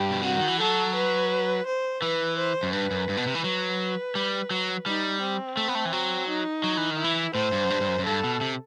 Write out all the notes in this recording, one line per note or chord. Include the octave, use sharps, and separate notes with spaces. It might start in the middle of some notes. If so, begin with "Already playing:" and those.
Already playing: G2 G4
B2
C3 F#4
D#3
E3
F#3 A4
B4
C5
E3 B4
C5
F#2
G2 B4
F#2
G2
B2
C3
E3
F#3 B4
G3
F#3
G3 D#4
C4
A3
B3
A3
E3
F#3
D#4
F#3
E3
D#3
E4
E3
A2 C5
G2
F#2
G2
G2
F#2
F#2
G2 A4
B2
C3